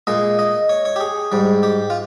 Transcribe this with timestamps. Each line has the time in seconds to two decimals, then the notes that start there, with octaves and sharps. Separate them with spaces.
0.07 A#2 G#3 D#5
0.39 D#5
0.69 C#5
0.85 C#5
0.96 G4
1.00 G#4
1.32 G#2 G3
1.63 G4
1.90 F4